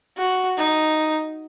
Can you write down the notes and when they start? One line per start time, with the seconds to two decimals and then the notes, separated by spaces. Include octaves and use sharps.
0.18 F#4
0.58 D#4